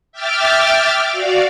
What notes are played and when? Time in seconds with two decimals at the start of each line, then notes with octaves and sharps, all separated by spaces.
0.12 E5 G5 D6 F6 A6
1.09 F#4 D5 F5